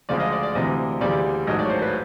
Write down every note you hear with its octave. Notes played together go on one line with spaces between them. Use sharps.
D2 C#3 F3 G#3 D5
D#5
D5
D5
D2 C3 E3 D#5
D2 C#3 E3 G3 D5
A1 G#2 D#3 F#3 D#5
D5
C#5
C5
B4